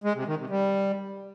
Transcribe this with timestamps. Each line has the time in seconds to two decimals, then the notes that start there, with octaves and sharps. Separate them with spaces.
0.04 G#3
0.15 C3
0.27 D#3
0.38 C3
0.50 G3